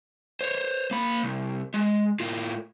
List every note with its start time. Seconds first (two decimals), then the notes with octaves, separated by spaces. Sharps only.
0.41 C5 C#5
0.91 A#3 B5
1.23 C2
1.74 G#3
2.20 A2 F4